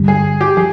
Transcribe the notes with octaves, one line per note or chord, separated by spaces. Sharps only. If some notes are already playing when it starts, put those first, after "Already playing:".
Already playing: G2 D3 G3
G#4
G4
F3 G#4